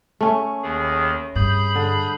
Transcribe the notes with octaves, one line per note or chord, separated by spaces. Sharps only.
A3 C#4
D#2 D#3 G#4
G2 G#4 B5 G6
D3